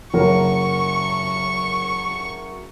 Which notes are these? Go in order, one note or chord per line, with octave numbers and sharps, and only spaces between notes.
F#1 F#3 A#4 C#6